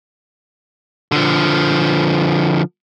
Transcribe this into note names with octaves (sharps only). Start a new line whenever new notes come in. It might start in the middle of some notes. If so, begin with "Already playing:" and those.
D3 F3